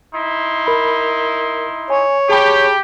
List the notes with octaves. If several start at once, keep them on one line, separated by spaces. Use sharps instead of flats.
D#4 E4 C6
A#4 B5
C#5 G#5
G4 G#4 A5 B5